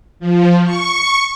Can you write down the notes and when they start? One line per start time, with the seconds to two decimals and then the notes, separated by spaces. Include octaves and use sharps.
0.20 F3
0.64 C#6